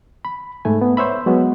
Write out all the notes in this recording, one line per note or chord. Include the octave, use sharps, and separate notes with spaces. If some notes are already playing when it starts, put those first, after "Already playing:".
B5
G#2 A3 G#5
B3
C5 C#5 E5 B5
F#3 G#3 B3